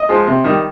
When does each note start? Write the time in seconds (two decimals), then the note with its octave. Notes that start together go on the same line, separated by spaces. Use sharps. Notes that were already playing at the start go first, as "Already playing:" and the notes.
Already playing: D#5
0.09 F3 G#3
0.27 C3
0.44 D#3 G3